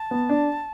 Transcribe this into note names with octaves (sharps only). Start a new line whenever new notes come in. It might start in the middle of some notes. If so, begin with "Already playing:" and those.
Already playing: A5
B3
D4